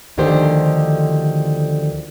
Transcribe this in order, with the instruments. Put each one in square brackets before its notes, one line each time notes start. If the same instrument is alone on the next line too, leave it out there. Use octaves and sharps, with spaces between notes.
[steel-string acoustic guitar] D2 D3 D#3 F3 G4 C5